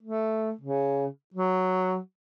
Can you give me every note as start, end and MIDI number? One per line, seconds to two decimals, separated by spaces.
0.03 0.51 57
0.61 1.06 49
1.34 1.98 54